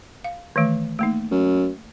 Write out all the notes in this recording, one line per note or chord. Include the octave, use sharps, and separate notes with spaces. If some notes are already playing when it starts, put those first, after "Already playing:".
F5
D#3 E3 A3
A3 A#3 D#4
F#2